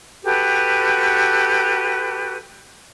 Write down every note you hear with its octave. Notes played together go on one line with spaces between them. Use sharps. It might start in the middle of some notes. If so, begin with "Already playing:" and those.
F#4 G4 A4 B4